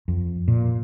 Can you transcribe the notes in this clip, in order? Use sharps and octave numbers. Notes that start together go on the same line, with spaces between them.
F2
A#2